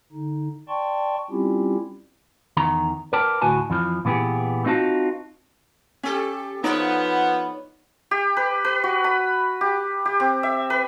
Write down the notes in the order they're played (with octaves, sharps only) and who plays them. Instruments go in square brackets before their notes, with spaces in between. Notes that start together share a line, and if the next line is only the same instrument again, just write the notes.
[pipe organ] D3 D#4
D5 G5 A5 C6 C#6
G3 C4 C#4 E4 F4 G4
[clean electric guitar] E2 D#3 A#5
A#4 B4 D5 G5 A5
D2 A2 F#4 G#5 A5
F2 E3 F3
A#2 E3 B3 G4 G#4
A3 C4 D#4 F4 F#4 A5
[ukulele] C#4 [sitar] G4 A4
[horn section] F3 B3 [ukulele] D#4 [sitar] B4 C#5 D5
[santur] G4
B4
B4
F#4
B5
G4
G4
C4
E5
B4